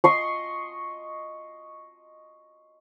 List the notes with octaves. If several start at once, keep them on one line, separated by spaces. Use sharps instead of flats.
D#5 C6 C#6